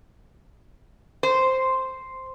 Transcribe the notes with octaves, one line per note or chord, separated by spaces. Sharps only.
C5